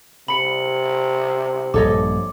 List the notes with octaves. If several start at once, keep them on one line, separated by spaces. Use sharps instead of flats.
C3 B5 C#7 F#7
A#1 G2 A4 C#5 D#5 D6